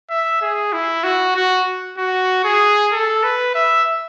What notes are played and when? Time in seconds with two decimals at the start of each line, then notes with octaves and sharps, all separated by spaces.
0.10 E5
0.41 G#4
0.73 E4
1.03 F#4
1.35 F#4
1.98 F#4
2.44 G#4
2.92 A4
3.23 B4
3.54 E5